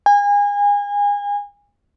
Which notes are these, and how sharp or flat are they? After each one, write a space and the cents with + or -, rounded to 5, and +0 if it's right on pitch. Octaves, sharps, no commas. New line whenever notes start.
G#5 -30